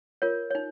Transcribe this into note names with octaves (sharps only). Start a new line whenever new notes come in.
F4 A#4 C#5
D#4 C#5